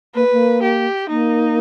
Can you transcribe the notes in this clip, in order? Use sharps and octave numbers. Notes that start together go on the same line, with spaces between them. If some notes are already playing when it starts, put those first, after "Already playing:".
A#3 B4
A#3
G4
A#3 D#4